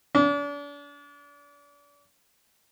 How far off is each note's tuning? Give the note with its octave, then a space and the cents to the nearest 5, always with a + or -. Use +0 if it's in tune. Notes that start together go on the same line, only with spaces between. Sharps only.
D4 -40